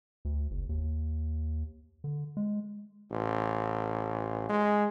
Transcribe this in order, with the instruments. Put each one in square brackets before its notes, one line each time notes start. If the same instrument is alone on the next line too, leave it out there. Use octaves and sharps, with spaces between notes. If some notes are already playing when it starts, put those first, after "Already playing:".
[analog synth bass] D2
F#1
D#2
D3
G#3
[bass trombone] A1
G#3